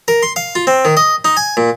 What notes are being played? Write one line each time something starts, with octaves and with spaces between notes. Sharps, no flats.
A#4
C6
F5
F4
C4
D#3
D#5
D#4
G#5
A#2